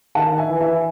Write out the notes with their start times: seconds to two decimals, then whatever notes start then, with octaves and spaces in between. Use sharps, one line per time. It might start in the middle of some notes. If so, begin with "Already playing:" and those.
0.15 D#3 F#5 A5
0.38 E5 G#5
0.49 E3
0.61 E5 G#5